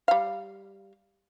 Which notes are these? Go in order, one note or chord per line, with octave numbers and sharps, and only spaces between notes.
G3 F5